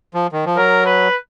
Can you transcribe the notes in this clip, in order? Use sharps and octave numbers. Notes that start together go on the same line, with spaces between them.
F3
D#3
F3
F#3 A#4
B4